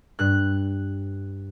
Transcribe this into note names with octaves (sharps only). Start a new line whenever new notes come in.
G2 F#6